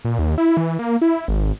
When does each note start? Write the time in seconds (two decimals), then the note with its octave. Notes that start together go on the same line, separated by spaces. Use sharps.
0.05 A#2
0.19 D#2
0.38 E4
0.57 E3
0.79 A#3
1.02 E4
1.28 G#1